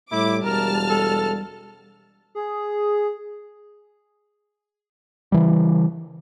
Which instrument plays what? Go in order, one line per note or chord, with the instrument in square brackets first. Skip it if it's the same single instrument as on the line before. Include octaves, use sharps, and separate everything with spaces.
[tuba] A2 [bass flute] G3 [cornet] E4 [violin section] D6
[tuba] E1 [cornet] A#4 [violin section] A5 F6
[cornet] A4
[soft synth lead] G#4
[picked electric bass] C#3 E3 G3